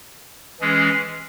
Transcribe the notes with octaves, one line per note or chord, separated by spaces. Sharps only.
E3 G#3 C#4 G#4